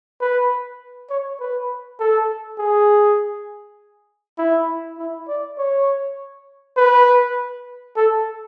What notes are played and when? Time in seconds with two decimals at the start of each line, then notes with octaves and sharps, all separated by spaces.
0.21 B4
1.10 C#5
1.40 B4
2.00 A4
2.59 G#4
4.39 E4
4.98 E4
5.28 D5
5.59 C#5
6.77 B4
7.97 A4